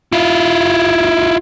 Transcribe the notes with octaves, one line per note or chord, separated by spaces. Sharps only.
E4 F4